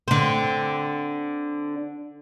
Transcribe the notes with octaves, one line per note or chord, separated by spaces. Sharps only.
D3 C4